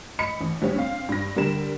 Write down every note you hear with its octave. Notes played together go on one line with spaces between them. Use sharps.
D#5 B5 C#7
A1
A#1 G3 C#5
C4 F5
G2 A#6
D3 G3 A#4 E7